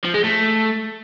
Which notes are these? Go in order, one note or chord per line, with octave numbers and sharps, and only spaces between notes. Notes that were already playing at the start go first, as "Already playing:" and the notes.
F3
G#3
A3